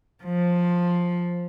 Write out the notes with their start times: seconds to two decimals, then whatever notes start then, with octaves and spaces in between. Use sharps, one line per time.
0.24 F3